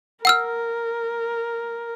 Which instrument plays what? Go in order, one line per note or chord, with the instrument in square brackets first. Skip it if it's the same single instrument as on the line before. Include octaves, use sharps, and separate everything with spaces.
[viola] A#4 [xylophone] F#5 E6 F6